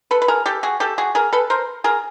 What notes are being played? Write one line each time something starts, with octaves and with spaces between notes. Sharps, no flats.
A4 B4
B4
G#4 A#4
G4 A4
F#4 G#4
G4 A4
F#4 G#4
G#4 A#4
A4 B4
A#4 C5
G#4 A#4